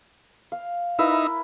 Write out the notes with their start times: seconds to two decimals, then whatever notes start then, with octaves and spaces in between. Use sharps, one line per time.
0.52 F5
0.99 D#4 E4 A#4 B4 E5